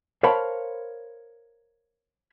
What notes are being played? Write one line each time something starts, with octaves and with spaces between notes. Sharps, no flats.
A#4 C5 C#5 F5 A5 B5